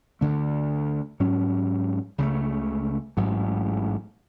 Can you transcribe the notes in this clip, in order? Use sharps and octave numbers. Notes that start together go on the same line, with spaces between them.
D2 D3 A3
G#2 F#3 C#4
C#2 C#3 F#3 A3
A1 G#2 F#3